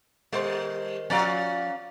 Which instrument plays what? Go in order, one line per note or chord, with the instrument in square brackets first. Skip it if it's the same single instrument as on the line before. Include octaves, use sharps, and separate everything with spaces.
[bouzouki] D#3 C5 [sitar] G3
[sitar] F3 F#4 D5 [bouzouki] C#4 F5